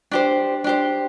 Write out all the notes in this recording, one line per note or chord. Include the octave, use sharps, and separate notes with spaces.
D4 G4 C5
D4 G4 C5